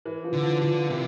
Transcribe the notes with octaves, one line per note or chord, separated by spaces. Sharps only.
E3
F3
D3
F3
D3 F3
C3 E3